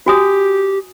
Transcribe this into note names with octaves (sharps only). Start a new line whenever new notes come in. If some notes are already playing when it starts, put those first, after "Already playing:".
F#4 G4 G#5 D#6